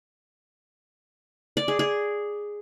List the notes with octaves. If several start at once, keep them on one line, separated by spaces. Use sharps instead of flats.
D5
G#4
G#4